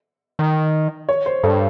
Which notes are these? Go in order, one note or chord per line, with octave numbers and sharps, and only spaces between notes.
D#3
C#5
C5
G2 A4